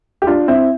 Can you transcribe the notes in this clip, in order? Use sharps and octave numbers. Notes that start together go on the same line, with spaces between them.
G4
D4 F4
C4 E4